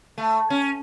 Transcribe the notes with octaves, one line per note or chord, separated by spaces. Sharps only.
A3
C#4